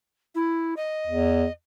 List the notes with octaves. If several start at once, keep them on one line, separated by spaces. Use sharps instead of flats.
E4
D#5
E2